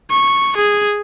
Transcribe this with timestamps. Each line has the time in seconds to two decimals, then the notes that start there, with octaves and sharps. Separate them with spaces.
0.11 C#6
0.57 G#4